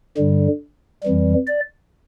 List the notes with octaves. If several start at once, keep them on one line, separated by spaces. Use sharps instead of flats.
G2 D3 G3
F2 E3 G3
D5